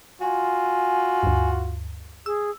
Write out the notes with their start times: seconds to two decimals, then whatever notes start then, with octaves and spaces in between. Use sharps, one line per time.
0.21 F4 F#4 G#5
1.23 D2 G2
2.26 G#4 E6